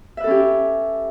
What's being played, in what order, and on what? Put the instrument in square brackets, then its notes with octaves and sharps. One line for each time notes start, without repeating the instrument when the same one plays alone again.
[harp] E5
B4
A4
C#4
G4